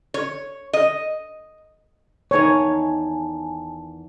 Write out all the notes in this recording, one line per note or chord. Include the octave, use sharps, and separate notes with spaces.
C#5
D#5
E2 D#3 D#4 C#5 G#5 A5